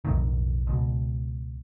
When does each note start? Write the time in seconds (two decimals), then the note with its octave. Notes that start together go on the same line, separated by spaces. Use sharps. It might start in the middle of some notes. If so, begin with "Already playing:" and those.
0.05 B1 F2 A2 D#3
0.67 C#2 B2